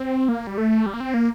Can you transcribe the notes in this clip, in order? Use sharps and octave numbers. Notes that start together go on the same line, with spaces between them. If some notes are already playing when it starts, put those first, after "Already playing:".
Already playing: C4
A#3
G3
A3
G3
A#3
C4
A#3